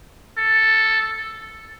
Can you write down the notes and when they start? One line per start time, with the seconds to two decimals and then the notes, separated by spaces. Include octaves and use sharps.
0.38 A4